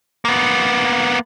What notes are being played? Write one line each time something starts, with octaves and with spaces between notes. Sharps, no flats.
A#3 B3